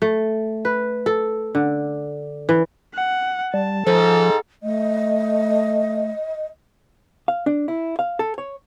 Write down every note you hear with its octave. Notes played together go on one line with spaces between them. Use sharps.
A3
B4
A4
D3
E3
F#5
G3 A5
G#2 F3 A4
A3 D#5
F5
D4
E4
F5
A4
C#5